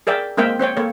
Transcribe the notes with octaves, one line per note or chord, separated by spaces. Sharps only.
G#4 A#4 D5 E5 G5
G#3 A#3 C4 A#4 E5 G5
C4 C5 C#5 G5
A#3 A4 C#5